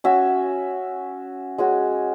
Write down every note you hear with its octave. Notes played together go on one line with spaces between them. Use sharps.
C#4 F#4 E5
G#3 C#4 F#4